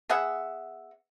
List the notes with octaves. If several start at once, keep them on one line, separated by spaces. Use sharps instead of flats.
B3 G#4 E5 F#5